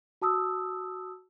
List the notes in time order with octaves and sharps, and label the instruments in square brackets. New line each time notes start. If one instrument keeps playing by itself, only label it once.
[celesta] F#4 A5 D#6 E6